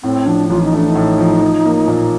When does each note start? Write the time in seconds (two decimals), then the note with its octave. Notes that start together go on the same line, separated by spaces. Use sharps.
0.03 A2 C4
0.26 F3 D4
0.49 A1 F4
0.63 D#4
0.72 A3 D4
0.89 D#4
0.95 A2
1.18 F3
1.42 F3
1.66 A#3
1.87 A#2